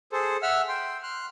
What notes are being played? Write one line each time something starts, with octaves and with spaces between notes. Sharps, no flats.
G#4 A4 C5
E5 F#5 E6 F6
G5 C6
C6 F6 F#6